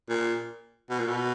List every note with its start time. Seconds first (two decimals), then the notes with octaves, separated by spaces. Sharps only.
0.09 A#2
0.90 B2
0.99 A#2
1.08 B2